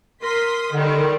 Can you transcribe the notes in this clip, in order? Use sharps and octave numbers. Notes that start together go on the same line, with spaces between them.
A#4 C6 D#6 B6
D3 D#3 G3